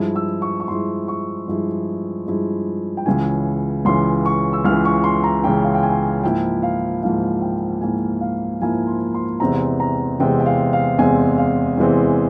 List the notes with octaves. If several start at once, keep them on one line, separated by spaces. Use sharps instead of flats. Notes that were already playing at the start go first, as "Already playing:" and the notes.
Already playing: G2 F3 G#3 E4
E6
C#6
C#6
G2 F3 G#3 E4 C6
C#6
G2 F3 G#3 E4
G2 F3 G#3 E4
G5
C#2 C#3 E3 G#5
C#2 C#3 E3 C6
C#6
E6
C#2 C#3 E3 F6
C#6
C6
A#5
C#2 C#3 E3 G5
F5
G5
G#5
G#2 F3 A#3 E4 G5
F5
G#2 F3 A#3 E4 F5
G5
G#2 F3 A#3 E4 G#5
F5
G#2 F3 A#3 E4 G#5
C6
C6
E2 C3 E3 G#3 C4 A#5
A#5
E2 C3 E3 G#3 C4 G5
G5
F5
F5
E2 C3 E3 G#3 C4 G#5
F5
E2 C3 E3 G#3 C4